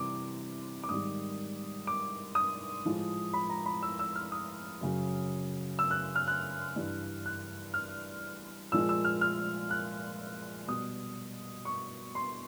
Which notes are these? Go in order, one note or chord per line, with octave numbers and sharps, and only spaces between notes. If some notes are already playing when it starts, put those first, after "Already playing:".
Already playing: C3 E3 G3 D6
D6
G#2 D#3 G3 D#6
D6
D#6
A2 F3 G#3
B5
A#5
B5
E6
E6
F6
D#6
F#2 C#3 F#3
E6
F#6
F6
F#6
G2 E3 G3
F#6
F6
A#2 F3 G#3 E6
E6
F6
F6
F#6
B2 G3 D#6
C#6
C6